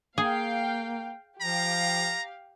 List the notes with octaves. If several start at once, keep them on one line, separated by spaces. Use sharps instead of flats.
A#3 G#4 F5 G5
F3 G4 F5 A#5